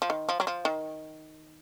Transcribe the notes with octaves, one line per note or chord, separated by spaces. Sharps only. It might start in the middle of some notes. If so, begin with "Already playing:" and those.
F3
D#3
F3
F#3
F3
D#3